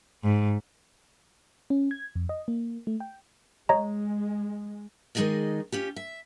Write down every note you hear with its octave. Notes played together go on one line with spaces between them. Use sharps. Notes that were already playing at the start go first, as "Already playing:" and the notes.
G#2
C#4
G#6
F2
D#5
A#3
A3
G5
G#3 C#5 D#5 A#5
D#3 G#3 D#4 G#4 D5 D#5
C#4 F4 G4
E5